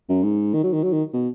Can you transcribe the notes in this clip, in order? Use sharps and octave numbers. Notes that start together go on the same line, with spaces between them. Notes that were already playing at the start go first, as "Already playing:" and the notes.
F#2
G#2
D#3
F#3
D#3
F#3
D#3
B2